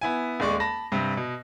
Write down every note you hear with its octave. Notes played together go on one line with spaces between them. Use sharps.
B3 E4 G#5
D#1 G#3 D5 C#6
A5 B5 A#6
G2 C3
B2